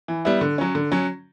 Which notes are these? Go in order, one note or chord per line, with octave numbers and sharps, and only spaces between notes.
E3
G3 B3 E4
D3
F#3 C#4
D3
F#3 C#4